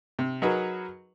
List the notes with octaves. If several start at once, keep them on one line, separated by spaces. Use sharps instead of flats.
C3
F#3 D#4 F#4 G#4 A#4 B4